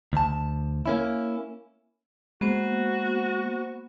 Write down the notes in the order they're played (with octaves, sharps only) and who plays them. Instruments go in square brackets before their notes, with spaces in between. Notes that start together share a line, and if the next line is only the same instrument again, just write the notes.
[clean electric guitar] D2 A5
A#3 C#4 E4
[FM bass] G#3 [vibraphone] A#3 B3 C5 [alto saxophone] F#4